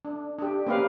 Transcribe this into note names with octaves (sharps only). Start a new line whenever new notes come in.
D4
D4 G4
A#3 C4 C#4 G4 B4 F5